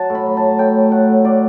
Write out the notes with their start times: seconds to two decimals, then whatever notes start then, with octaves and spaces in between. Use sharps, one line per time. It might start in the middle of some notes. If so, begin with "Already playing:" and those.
Already playing: F#3 F#5 A5
0.10 A2
0.15 B5
0.26 F#3
0.37 A5
0.42 A2
0.59 A2 G5
0.76 A2
0.92 A2 F#5
1.09 A2
1.25 A2 D5